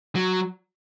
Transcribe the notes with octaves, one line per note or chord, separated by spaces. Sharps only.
F#3